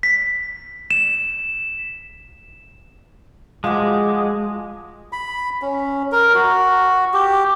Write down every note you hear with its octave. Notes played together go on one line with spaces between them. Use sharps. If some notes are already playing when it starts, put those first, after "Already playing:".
B6
E7
F3 G#3 F#4 D6
B5
C#4
A#4
F#4
G4